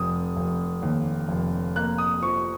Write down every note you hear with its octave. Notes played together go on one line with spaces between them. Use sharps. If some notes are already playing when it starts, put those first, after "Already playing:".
Already playing: F1 D#6
F1
D#2
F1
A#3 F#6
D#6
F3 C#6